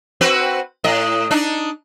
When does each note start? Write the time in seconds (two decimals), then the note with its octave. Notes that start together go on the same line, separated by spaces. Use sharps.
0.21 C4 F#4 B4
0.84 A2 D#5
1.31 D4 D#4